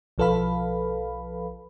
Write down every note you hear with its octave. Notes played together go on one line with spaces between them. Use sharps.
B1 F3 A4 B4 F5 B5